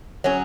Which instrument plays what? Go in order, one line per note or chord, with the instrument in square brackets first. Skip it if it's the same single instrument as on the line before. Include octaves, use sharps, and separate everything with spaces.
[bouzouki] F#3 C#4 G#4